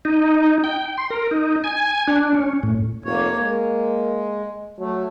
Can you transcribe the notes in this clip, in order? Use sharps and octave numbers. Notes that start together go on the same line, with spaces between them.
D#4
G5
C6
A#4
D#4
G#5
D4
C#4
A2
F1 A#3 C#5
G#3 A#3
F#3 A3